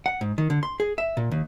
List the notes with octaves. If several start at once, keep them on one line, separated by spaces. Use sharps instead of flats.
F#5
G#2
D#3
D3
C6
G#4
E5
A#2
D#2